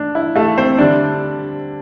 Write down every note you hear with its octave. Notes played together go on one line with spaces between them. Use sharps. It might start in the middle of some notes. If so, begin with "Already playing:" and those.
Already playing: A3 D4
E4
A3 A4
C4 C5
D3 G3 D4 D5